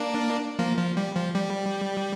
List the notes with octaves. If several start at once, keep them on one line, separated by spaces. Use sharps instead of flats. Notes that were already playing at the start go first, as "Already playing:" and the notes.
Already playing: A#3 D4
F3 A#3
F3
G3
F3
G3